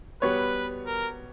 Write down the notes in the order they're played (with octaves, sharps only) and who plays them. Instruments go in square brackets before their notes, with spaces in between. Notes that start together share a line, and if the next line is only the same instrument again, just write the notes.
[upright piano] G3 B3 F#4 C#5 [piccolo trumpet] B4
[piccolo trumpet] A#4